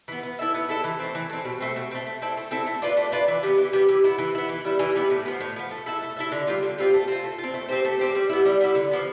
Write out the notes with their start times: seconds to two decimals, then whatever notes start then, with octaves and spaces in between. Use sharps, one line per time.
0.08 E3 B3
0.23 B3
0.39 E4 A4 E5
0.54 B3
0.69 E4 A4 E5
0.84 E3
0.99 A3 C4
1.15 E3
1.30 A3 C4
1.45 B2
1.60 A3 C4
1.76 B2
1.91 A3 C4
2.06 A3
2.22 C4 E4 A4
2.37 A3
2.51 C4 E4 A4
2.67 A3
2.82 D4 F4 B4
2.97 A3
3.12 D4 F4 B4
3.28 E3
3.43 G3 B3
3.58 E3
3.73 G3 B3
3.89 E3
4.04 B3 E4
4.18 E3
4.35 B3 E4
4.49 E3
4.65 G3 B3 E4
4.79 E3
4.95 G3 B3 E4
5.10 A2
5.25 F3 B3
5.40 A2
5.56 F3 B3
5.71 A3
5.86 E4 A4 E5
6.02 A3
6.17 E4 A4 E5
6.32 D3
6.47 G3 C4 F4
6.63 D3
6.78 G3 C4 F4
6.93 A3
7.08 C4 F4
7.24 A3
7.38 C4 F4
7.54 A3
7.69 C4 G4 C5
7.85 A3
7.99 C4 G4 C5
8.15 G3
8.29 B3 E4
8.45 G3
8.60 B3 E4
8.75 D3
8.91 F3 B3